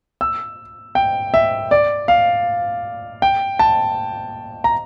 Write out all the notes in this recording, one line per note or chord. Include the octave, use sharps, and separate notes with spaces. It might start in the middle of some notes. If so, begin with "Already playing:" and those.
E6
G5
E5
D5
F5
G5
A5
A#5